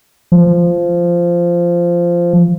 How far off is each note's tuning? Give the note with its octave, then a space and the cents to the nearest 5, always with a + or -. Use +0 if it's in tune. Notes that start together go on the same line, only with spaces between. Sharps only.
F3 -10